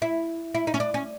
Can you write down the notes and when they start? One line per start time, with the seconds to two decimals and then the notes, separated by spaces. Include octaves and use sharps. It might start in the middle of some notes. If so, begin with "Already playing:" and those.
0.02 E4
0.54 E4
0.67 D#4
0.74 C#4
0.80 D4
0.94 C#4